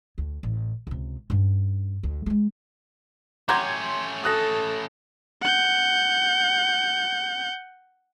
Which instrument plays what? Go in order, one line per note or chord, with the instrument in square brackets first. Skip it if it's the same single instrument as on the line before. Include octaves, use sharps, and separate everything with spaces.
[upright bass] D2
A1
C#2 C3
G2 C#4
D2
G#3 A3
[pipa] F#3 G4 [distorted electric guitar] A3 C#4 [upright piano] C6 G6 G#6
[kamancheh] A4 [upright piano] D#6 F#6 A#6
[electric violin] F#5 G6